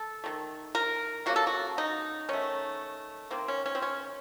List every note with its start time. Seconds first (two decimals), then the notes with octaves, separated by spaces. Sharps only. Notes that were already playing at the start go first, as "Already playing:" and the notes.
Already playing: A4
0.24 D#3 A3
0.75 A#4
1.26 C#3 F#3 A#3 F#4
1.36 A4
1.47 F#4
1.78 D#4
2.29 D#3 A3 C#4
3.31 D#3 A#3 C4
3.48 C#4
3.66 C#4
3.75 C4
3.82 C#4